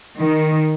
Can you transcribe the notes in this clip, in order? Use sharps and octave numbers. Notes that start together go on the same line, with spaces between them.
D#3